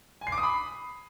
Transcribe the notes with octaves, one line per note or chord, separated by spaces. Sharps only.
G#5
C7
D6
D#6
B5